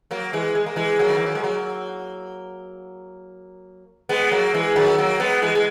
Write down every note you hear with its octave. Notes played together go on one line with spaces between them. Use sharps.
F#3 A#3
E3 G#3
G#3
A#3
E3 G#3
F#3 A#3
D#3
E3
F#3
G#3
F#3 A#3
G#3 B3
F#3 A#3
E3 G#3
D#3 F#3
F#3 A#3
G#3 B3
E3 G#3
G#3